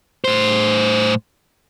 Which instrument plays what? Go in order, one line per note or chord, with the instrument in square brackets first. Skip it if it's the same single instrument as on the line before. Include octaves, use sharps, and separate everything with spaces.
[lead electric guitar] A2 C5